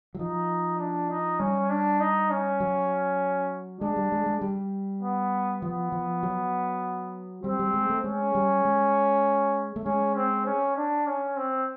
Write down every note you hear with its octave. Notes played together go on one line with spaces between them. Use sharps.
F#3
F3 D#4
D4
D#4
G3 C#4
D4
D#4
C#4
F#3
G#3 D4
G3
G#3
G#3
G3
B3
F3 B3
F3
F#3
G3 C4
G3
G#3
A3
G#3 C#4
G3
G#3
A3
G#3 C#4
C4
C#4
D4
C#4
C4